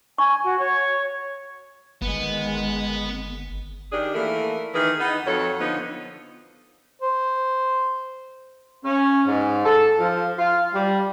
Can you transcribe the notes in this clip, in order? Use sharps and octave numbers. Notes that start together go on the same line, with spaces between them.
G#5 C#6
F#4
C#5
G1 D#3 G#3 B3
D#3 D4 G4 G#4
E3 A3 A#3 A#4
D#3 E3 G#4
B3 D#4
F2 F#3 A4 C#5
D3 F3 B3 D#4
C5
C#4
G#2
A4
F3
F4
G3